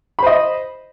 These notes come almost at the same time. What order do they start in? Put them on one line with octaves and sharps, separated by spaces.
B5 C5 D#5